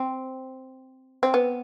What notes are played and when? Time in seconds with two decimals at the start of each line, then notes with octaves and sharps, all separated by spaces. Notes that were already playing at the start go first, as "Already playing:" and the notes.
Already playing: C4
1.23 C4
1.34 B3